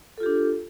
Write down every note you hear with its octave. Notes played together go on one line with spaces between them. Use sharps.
D4 F4 G4 A4